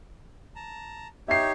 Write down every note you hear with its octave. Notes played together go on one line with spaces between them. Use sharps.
A5 A#5
D#4 G4 C#5 E5 C7